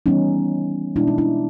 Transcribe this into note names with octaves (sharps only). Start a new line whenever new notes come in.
E3 G3 B3 C#4 D#4
B2 G#3 B3 D4 E4
D#4
D4 E4